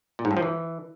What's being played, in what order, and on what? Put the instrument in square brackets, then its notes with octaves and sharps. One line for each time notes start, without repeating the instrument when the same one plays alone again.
[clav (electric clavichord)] A#2
G#2
G2
F3
E3